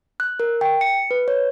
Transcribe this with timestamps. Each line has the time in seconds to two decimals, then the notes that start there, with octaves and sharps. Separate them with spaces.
0.20 F#6
0.40 A#4
0.61 G5
0.81 C#7
1.11 B4
1.28 C#5